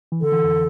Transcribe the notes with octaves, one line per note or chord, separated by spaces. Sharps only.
E3
D3 A4
E3
F2